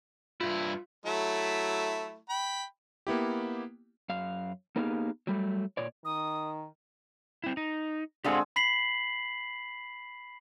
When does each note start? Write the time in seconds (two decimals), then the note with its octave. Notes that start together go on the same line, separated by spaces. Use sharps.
0.41 G2 E4 F4
1.06 F#3 A3 E4
2.29 G5 B5
3.07 A#3 B3 E4 G4
4.09 F#2 F5
4.76 A#3 B3 D#4 G4 G#4 F5
5.27 F#3 G3 A3
5.77 A#2 C#5 D5
6.05 D#3 D#6
7.44 C4 E4
7.57 D#4
8.24 D3 G#3 C4 G4 F5 F#5
8.56 B5 B6 C7 F#7